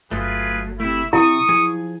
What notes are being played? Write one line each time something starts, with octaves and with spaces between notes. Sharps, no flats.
G1 F#3 A3 F4 G#4 B4
C3 A3 E4
C3 F#3 E4 C#6 D#6
F3 G#4 G#5